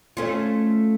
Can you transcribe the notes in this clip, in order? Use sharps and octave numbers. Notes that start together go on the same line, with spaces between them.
A3 C#4 F4